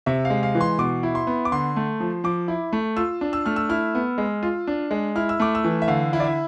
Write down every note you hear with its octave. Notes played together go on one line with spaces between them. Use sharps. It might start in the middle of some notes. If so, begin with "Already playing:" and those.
C3 E5
F5
G#3
F5
E3
C6
B2 D6
E4
C6
B3
D6
D3 C6
A3
F3
F3 D6
E4
A3
F4 E6
D4
E6
A3 F6
E6
E4 F6
B3
G#3
F4
D4
G#3
E4 F6
E6
A3 D6
E6
E3
E5
D3 F5
E4
D5
E5